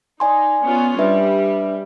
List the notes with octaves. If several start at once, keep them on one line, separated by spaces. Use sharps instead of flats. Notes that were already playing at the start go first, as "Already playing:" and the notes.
D#4 D5 G#5 C6
B3 C#4 F4
G3 D4 B4 E5